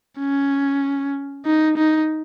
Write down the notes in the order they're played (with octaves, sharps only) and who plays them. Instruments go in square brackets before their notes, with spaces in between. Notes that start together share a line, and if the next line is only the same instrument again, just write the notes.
[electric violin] C#4
D#4
D#4